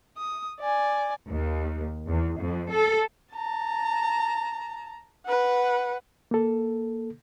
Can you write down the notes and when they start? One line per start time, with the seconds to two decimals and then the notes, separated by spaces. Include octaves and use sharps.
0.17 D#6
0.61 D5 G#5
1.28 D#2
2.09 E2
2.39 F2
2.72 A4
3.34 A5 A#5
5.25 B4 F#5
6.31 A#3 A4